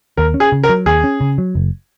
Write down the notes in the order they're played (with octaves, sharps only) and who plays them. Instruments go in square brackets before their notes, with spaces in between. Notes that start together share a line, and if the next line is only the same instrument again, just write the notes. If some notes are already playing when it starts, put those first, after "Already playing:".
[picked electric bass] D#2 [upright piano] A#4
[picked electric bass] C#4
[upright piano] G#4
[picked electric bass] C#3
[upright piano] A#4
[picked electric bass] F#3
[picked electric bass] D#2 [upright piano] G#4
[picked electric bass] C#4
C#3
F#3
F#1